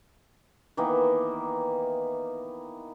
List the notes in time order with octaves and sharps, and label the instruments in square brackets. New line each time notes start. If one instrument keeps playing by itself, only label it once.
[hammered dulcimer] D#3 E3 A#3 B3